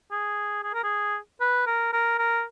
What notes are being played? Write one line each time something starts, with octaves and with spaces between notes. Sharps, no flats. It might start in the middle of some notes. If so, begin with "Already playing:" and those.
G#4
G#4
A#4
G#4
B4
A#4
A#4
A#4